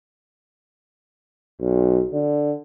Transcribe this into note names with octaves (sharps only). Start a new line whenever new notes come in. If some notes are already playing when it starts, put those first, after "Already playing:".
B1
D3